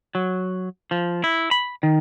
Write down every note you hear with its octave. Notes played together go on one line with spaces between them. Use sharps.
F#3
F3
E4
B5
D#3